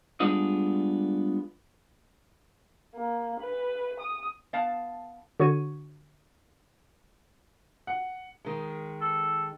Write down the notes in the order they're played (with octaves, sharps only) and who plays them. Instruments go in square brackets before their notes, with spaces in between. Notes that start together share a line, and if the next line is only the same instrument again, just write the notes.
[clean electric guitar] G3 G#3 B3 D4 F4 D#5
[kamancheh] A#3
B4
D#6
[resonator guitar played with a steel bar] B3 F5 A5
[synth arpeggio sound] D3 F#4 C#5 C#6 G#6 D#7
[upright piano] F#5
[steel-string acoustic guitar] D#3 G#3
[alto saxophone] A4